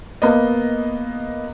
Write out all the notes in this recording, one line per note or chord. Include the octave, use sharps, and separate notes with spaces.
A#3 B3 D#5